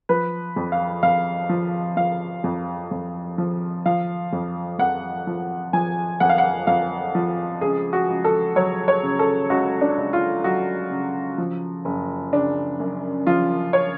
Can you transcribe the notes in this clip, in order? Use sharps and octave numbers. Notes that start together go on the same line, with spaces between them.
F3 B4
F2
F5
F2 F5
F3
F3 F5
F2
F2
F3
F3 F5
F2
F2 F#5
F3
F3 G#5
F2 F#5
F5
F#5
F2 F5
F3
C#2 G#4
F#4
C#2
A4
F#3 C#5
C#5
C#3
A4
C#2 F#4
D4
C#2
F4
F#3 F#4
C#3
F3
F#1
C#3 D4
F#2
F3 F4
C#5